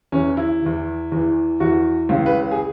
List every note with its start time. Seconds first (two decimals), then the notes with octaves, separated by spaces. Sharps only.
0.12 E2 E3 C#4
0.37 E4
0.62 E2 E3
1.12 E2 E3
1.60 E2 E3 F#4
2.09 C#2 C#3 E3
2.26 B4
2.51 G#4